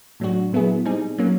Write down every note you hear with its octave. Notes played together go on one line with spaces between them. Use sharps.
A2 F#3 A3 D4 F#4
A#2 F#3 B3 E4 G#4
G3 C4 D#4 G#4
F#3 A#3 C#4